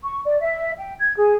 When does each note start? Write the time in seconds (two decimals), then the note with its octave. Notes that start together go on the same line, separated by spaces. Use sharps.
0.03 C#6
0.24 D5
0.41 E5
0.77 G5
1.00 G#6
1.17 G#4